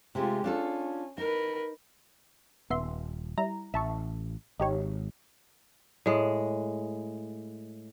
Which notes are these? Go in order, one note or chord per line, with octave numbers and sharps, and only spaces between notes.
C3 G#3 A3 F4 G4
C#4 D4 F4 A4
D#4 A#4 B4
D#1 B3 E5 C6
G3 E4 A#5
A1 E5 A5 C#6
G#1 D#4 G4 C#5
A2 G#3